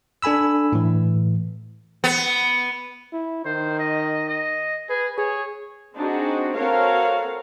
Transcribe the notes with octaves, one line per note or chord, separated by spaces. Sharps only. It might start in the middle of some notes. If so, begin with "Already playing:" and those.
D4 A4 G#5 B5 E6
A2 E3
B3
E4
D#3 C5
D#5
D#5
G#4 B4
G#4 C#5
C4 D4 D#4 F#4 G#4
C4 F#4 A4 A#4 C#5 F5